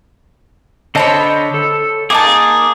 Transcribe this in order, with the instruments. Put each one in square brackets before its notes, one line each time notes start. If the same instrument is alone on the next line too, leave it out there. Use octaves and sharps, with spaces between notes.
[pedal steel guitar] D3 D#5 A5 [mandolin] C5 C#5 B5
[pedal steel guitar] A4
[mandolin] A#3 D#4 A5 [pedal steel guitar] G#4 D6